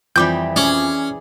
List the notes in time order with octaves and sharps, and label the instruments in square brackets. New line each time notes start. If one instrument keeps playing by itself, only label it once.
[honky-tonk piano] F2 [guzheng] E3 G3 G5 [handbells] D6 G6
[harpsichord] C#4 [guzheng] G#4 D5